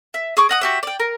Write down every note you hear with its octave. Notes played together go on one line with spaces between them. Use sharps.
E5
G#4 C#6 D6
D#5 F#5 D#6
F#4 G4 E5
D5 G5
A#4